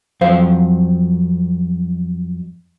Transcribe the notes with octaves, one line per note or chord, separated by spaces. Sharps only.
F2 F#3 C5 F5